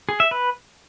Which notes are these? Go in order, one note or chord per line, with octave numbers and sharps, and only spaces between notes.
G#4
E5
B4